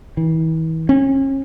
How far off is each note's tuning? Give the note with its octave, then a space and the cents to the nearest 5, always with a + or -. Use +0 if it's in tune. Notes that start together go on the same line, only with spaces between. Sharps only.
E3 -40
C#4 -35